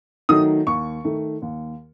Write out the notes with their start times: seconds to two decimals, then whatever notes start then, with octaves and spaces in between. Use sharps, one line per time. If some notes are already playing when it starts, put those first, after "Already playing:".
0.29 D#3 F#3 A3 D#4 D#6
0.67 D#2 C#6
1.05 D#3 A3
1.42 D#2